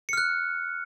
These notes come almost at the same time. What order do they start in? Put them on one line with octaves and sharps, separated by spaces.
C#7 F6 F#6